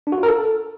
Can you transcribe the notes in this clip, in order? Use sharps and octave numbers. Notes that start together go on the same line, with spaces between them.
D4
F#4
F4
A#4
A4